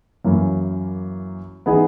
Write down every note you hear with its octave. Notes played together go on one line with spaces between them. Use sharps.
F#2 E3 A#3 C#4
E3 B3 D#4 G#4